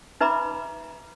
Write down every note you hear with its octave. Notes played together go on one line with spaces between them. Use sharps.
D#4 B4 E5 A#5 B5 D6